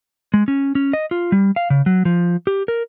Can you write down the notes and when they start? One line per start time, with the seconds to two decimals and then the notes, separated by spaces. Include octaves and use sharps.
0.34 G#3
0.48 C#4
0.75 C#4
0.93 D#5
1.11 F4
1.32 G3
1.56 F5
1.70 C#3
1.86 F#3
2.05 F3
2.47 G4
2.68 A#4